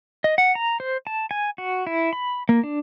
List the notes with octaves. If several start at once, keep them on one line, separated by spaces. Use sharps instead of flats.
D#5
F#5
A#5
C5
A5
G#5
F#4
E4
B5
A#3
D4